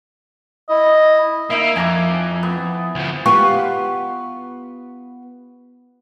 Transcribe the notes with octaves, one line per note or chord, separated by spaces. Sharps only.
E4 D#5
A#3 D#4 E4 E5
F2 G#5 A#5 D6
B3
D2 F3
B3 F4 G4 C#6